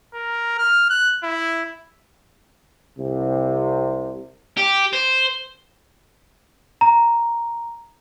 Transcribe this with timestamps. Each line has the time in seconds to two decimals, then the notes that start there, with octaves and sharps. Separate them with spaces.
0.14 A#4
0.58 F6
0.90 F#6
1.23 E4
2.98 C2 C3
4.58 G4
4.93 C5
6.81 A#5